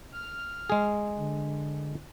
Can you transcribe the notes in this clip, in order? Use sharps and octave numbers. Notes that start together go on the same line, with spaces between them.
F6
G#3 G#4
D3